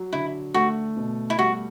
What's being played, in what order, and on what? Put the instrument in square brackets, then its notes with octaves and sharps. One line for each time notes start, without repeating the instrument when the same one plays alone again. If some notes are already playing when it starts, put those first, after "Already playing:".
Already playing: [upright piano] F#3
[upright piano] D3 [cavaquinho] E4
[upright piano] A3 [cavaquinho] F#4
[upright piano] B2
[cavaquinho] E4
[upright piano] G3 [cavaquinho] F#4